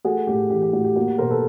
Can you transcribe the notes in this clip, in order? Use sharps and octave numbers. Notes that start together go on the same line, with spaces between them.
A3 F#4 G#4
A2 G4
E3 G4
G4
A2 F#4
G4
A#3 F#4
G4
B2 A#4 C5
A4 B4